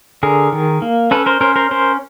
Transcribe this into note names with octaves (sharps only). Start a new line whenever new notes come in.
D3 G#4 A#4
D#3
A#3
C#4 A4 B4
A#4 C5
C#4 A#4 C5
A#4 C5
C#4 A#4 C5